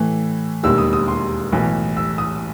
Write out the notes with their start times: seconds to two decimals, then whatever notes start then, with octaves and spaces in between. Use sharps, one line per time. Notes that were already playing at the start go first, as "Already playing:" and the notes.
Already playing: A2 E3 A3
0.63 E1 D#2 D#3 G3 E6
0.78 D#6
0.93 D#6
1.08 C6
1.52 B1 A2 E3
1.96 E6
2.18 D#6